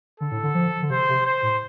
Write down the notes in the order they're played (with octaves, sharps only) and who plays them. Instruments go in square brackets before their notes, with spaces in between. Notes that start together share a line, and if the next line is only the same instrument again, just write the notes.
[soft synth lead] D3 [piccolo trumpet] A4
[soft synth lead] A2
D3
F3
D3
[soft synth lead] C3 [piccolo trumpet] C5
[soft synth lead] C3
[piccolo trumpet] C5
[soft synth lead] A2